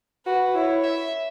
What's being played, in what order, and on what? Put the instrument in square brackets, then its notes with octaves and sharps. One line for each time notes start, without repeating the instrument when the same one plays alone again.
[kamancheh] F#4 [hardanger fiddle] B4
[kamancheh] E4 [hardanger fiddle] C#5
[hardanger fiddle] E5